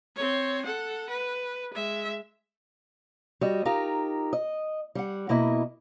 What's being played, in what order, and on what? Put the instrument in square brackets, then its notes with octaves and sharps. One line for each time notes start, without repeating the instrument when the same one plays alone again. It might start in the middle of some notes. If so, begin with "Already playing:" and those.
[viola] C4 C#5
A4 F#5
B4
G#3 E5
[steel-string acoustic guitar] G3 F#4 D5 D#5
D#4 F4 G4 A#4
D#5
G3 F#5
B2 A#3 E4 D#5